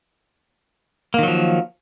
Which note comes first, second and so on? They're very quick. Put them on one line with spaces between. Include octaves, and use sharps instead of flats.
A#3 D#3 F#3 F3